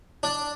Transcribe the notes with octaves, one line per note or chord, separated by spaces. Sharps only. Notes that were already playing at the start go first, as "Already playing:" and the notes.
D4